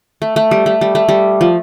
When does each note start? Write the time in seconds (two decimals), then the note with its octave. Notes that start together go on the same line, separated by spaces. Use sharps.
0.22 A3
0.36 A3
0.51 G3
0.66 A3
0.81 G3
0.95 A3
1.08 G3
1.41 F3